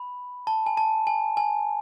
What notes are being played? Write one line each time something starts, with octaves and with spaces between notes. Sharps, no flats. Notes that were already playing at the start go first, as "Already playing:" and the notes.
Already playing: B5
A5
G#5
A5
G#5
G#5